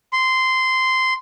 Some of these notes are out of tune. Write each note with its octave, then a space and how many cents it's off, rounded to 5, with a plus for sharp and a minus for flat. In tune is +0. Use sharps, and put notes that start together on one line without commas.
C6 -10